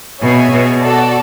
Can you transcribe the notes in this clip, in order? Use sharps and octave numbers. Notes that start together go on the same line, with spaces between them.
B2 G#4 C#5 E5 G#5
B2
F#4 A4 D5 A5